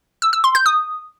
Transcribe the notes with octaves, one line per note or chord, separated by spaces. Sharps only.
E6
E6
C6
G6
D#6